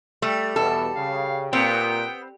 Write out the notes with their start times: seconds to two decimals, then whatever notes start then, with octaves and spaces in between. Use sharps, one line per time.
0.22 G3 A3
0.56 E2 B2 E4 A4
0.96 C#3 F5
1.53 A#2 B3 C4 G5